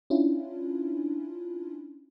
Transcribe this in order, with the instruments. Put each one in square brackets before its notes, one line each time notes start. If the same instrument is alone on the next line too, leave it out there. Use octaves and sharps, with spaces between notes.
[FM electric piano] C#4 D4 E4 F4